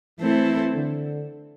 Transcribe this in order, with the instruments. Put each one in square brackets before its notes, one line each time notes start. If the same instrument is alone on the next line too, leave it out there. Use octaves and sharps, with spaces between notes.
[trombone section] E3 [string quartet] A3 C4 E4 A4 C5
[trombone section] D3